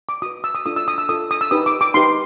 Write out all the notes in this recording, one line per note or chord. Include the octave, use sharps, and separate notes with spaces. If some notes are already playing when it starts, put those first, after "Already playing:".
D6
F#4 B4 D#6
E6
D#6
D4 F4 A4 D#6
E6
D#6
E6
D4 F4 A4 D#6
D#6
E6
D#4 G4 B4 D#6
D6
D6
D#4 G4 B4 C6